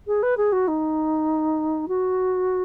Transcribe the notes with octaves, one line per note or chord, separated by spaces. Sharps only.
G#4
B4
G#4
F#4
D#4
F#4